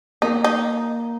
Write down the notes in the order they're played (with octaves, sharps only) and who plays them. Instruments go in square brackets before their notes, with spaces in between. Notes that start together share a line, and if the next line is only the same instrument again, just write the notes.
[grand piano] A#3 [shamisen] D#4
[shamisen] D#4